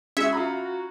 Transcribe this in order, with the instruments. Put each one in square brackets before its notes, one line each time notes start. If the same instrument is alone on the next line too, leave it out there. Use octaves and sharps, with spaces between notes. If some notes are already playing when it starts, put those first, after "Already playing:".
[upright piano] G#3 E4 G#4 [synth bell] C#4 [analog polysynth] F#4 [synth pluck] E5
[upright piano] F4 A#5 B5